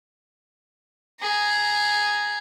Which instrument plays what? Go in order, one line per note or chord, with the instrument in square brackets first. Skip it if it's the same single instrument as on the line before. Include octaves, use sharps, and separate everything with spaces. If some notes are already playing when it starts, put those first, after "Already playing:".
[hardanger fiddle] G#4 A#5